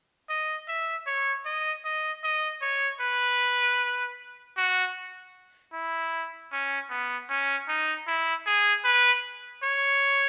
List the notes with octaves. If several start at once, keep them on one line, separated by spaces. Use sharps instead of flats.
D#5
E5
C#5
D#5
D#5
D#5
C#5
B4
F#4
E4
C#4
B3
C#4
D#4
E4
G#4
B4
C#5